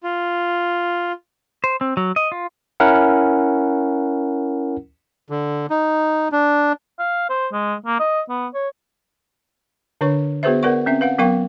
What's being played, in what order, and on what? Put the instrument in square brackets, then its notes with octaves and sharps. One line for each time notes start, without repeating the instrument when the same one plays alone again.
[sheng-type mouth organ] F4
[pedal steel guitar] C5
C4
F#3
D#5
F4
[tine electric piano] C#4 E4 A#4 F#5
[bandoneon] D3
D#4
D4
[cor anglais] F5
C5
G#3
A#3
D#5
B3
C#5
[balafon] D3 D4 B4 C#5 C#6
B3 F#4 G#4 B4 C5 E5
B3 A#4 B4 D5 F#5 C#6
C4 C#4 E5
B4 F5 F#5
F#3 B3 A#4 F5 G5 C#6